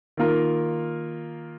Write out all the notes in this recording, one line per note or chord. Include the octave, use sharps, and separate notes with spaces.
D#3 A#3 F4 A#4